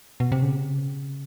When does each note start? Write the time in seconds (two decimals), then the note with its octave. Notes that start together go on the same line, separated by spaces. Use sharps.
0.20 B2
0.32 C3
0.42 C#3